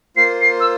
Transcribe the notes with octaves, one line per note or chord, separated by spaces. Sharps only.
A#3 F4 C5 C7
C7
E6